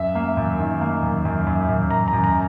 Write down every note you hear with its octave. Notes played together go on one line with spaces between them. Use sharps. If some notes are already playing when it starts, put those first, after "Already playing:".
Already playing: F#2 E5
A#3
F#2
D#3
A#3
F#2
F#2
F#2
F#2
F#2 A#5
A#5
F#2
A#5